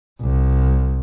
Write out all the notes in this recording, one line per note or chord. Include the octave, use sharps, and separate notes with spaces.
C2